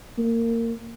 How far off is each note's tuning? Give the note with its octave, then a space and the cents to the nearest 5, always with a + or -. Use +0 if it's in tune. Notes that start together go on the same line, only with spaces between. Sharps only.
A#3 -20